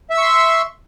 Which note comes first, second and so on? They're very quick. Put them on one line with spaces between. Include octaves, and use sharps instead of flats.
E5 E6 C#6 C6